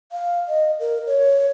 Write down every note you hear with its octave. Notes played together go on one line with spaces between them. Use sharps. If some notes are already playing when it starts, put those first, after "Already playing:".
F5
D#5
A#4
C#5